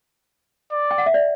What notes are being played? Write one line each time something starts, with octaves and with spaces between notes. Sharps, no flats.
D5
G5
F#5
E5
D5